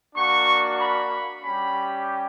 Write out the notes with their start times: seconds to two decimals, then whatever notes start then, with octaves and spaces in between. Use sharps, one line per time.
0.16 A#3 D4 F#4 C#6
0.80 B5
1.43 G3 C#4 G4 B5